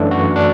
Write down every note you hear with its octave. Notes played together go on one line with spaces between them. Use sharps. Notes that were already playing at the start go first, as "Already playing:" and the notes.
Already playing: F#2 E3 A3 D4
F#4
D4